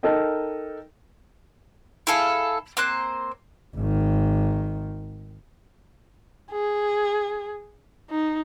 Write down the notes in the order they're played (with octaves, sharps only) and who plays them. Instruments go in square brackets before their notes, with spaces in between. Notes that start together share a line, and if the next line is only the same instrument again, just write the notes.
[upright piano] D#4 A4 A#4 D#5 G5
[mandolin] E4 G#4 A4 F5
A#3 C4 C5 F#6
[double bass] G#1 D#3
[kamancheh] G#4
D#4